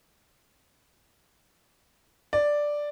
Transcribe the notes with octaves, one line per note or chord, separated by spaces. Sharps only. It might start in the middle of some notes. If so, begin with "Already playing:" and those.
D5